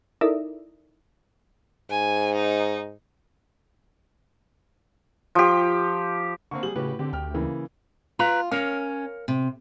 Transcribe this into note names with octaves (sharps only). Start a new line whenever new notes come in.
D#4 E4 A4 A#4 D5 E5
G#2 G#5
D#4
F3 G4
D3 A#3 C4 C#6
G3 G#4 F#7
A2 C#3 F#4 G4 B4
D3 C4 G4
D2 G5 F6
C#3 E3 A#3
F4 B4 A#5
C#4 A#4 C#5 F5
C3